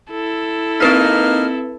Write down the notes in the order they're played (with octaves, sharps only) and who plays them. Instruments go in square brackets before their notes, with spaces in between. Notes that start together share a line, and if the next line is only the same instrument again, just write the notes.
[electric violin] E4 A4
[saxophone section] A#3 D#4 [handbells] C4 B4 B6 [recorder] F6